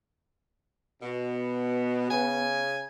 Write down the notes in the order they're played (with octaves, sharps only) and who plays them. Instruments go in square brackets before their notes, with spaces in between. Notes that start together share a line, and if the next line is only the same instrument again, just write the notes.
[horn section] B2 [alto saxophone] B3
[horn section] C#3 G#5